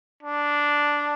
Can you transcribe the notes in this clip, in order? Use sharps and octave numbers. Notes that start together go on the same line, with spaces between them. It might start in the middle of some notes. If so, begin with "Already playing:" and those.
D4